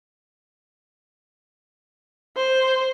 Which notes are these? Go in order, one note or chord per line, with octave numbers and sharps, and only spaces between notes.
C5